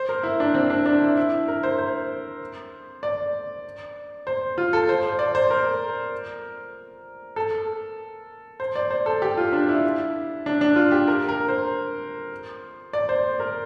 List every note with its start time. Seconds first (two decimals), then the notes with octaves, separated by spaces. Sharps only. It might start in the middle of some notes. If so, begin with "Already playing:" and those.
Already playing: C5
0.09 A#4
0.23 E4
0.40 D4
0.54 C4
0.70 D4
0.86 D4
1.02 E4
1.17 E4
1.48 A#4
1.63 C5
1.79 C5
3.03 D5
4.27 C5
4.58 F4
4.73 A4
4.89 C5
5.03 C5
5.19 D5
5.35 C5
5.50 A#4
7.36 A4
8.60 C5
8.75 D5
8.91 C5
9.06 A4
9.22 G4
9.37 F4
9.53 D4
9.69 E4
10.46 D4
10.61 D4
10.76 F4
10.92 G4
11.08 A#4
11.29 A#4
11.48 C5
12.93 D5
13.09 C5
13.40 A#4